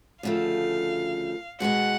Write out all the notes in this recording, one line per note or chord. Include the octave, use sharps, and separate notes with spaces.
D2 C#3 F3 A3 F5
B2 G#3 B3 F#4 F#5